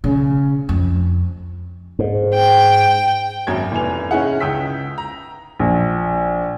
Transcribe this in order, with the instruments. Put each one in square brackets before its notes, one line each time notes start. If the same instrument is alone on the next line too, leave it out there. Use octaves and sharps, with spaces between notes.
[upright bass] C#3
F2
[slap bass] G#2
[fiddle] G5
[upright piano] G#1 F#2 G#6
F1 E3 G#5 F7
C#4 D#4 E4 G#4 F#5
C#2 G5 D#6 E6 B6
A#5
[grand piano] A#1